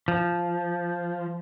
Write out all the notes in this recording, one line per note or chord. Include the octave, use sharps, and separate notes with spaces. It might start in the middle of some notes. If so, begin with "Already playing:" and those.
F3